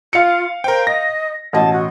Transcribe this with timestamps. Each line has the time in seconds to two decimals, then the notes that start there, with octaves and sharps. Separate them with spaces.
0.13 F4 F5 C#7
0.64 A#4 C5 G5
0.87 D#5 A#6
1.53 A1 B2 D#5 A5
1.73 F#4